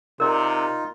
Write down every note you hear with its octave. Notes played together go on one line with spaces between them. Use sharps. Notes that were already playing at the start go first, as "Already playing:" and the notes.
C3 D#4 F4 A#4 D5 B5